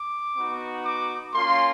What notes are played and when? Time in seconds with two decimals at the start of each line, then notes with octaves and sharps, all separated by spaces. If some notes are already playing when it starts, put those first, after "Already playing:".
Already playing: D6
0.36 B3 D#4 F#4
0.85 D6
1.33 A#3 C#4 F4 C6